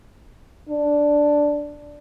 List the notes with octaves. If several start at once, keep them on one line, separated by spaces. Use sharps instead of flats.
D4